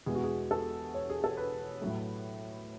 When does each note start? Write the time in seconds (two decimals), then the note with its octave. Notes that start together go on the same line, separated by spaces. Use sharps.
0.06 E2 B2 G#3 G#4
0.15 F#4
0.24 G#4
0.51 A4
0.94 C#5
1.10 G#4
1.24 A4
1.37 B4
1.82 A2 F#3 A3